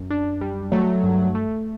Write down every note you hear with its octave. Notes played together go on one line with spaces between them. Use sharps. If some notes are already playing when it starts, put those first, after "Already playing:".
Already playing: F#2
D4
G3
F#3 A3
G2
A3